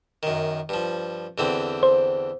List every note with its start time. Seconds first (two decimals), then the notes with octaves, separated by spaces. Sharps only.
0.23 F#2 D#3
0.69 G2 F3
1.38 E2 D3 C4
1.83 C5